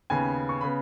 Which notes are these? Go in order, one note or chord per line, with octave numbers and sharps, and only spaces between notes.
D#2 C#3 B3 G#5
C#6
C#3 B3 B5